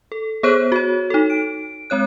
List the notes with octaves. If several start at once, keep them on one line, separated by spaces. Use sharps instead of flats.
A4
B3 G#4 C5 C#5 F#6
F#4 C#5
D#4 A4
D7
G#3 C4 C#5 F#6